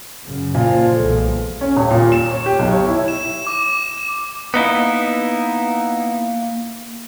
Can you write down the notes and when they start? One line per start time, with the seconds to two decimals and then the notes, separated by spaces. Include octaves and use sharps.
0.24 F#2 C#3
0.55 A#2 F3
0.95 B1 E2 G#3 A4
1.61 C#4
1.77 D#1
1.90 A#2
2.12 E7
2.31 C#5
2.46 G4
2.59 B1
2.71 C#5
2.87 E4
3.08 E7
3.47 D6
4.54 A#3 B3 D#4 E4